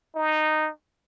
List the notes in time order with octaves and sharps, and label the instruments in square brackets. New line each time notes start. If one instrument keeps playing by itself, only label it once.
[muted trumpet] D#4